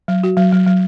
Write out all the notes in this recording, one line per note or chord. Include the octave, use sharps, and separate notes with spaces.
F#3
F#4
F#3
F#3
F#3